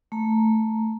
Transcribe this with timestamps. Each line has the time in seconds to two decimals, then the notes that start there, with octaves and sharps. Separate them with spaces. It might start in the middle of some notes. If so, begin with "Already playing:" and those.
0.12 A3 A#5